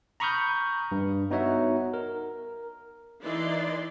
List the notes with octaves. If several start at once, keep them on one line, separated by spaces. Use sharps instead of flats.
A#5 B5 C#6 D#6 F6 G6
G2
B3 D#4 F#4 C#5 E5 F#5
A#4
E3 D#4 E4 D5 C6